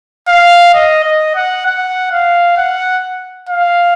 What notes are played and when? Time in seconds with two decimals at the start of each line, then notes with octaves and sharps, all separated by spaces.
0.28 F5
0.74 D#5
1.04 D#5
1.35 F#5
1.66 F#5
2.12 F5
2.57 F#5
3.49 F5